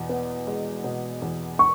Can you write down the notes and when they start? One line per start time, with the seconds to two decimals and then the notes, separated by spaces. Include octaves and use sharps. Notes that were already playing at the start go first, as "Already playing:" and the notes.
Already playing: E2 B2
0.09 B3
0.47 G#3
0.84 B2
1.22 E2
1.59 C#6